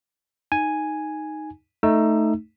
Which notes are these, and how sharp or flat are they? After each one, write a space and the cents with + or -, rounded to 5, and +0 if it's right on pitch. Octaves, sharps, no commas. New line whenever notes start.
D#4 +0 G#5 +0
A3 +0 D#4 +0 E6 +25